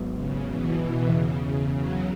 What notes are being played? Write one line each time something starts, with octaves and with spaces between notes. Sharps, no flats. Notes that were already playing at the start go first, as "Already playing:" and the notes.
Already playing: G#1 G#2 F#3 B3
C#3
B2 E3
B2 E3
E2 C#3 E3 B3
C#3
C#3 F#3